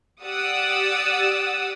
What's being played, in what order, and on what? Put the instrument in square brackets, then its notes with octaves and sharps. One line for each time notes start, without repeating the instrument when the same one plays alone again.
[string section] G4 D5 F#5 D#6 E6